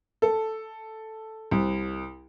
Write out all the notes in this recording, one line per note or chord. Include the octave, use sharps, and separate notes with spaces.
A4
C2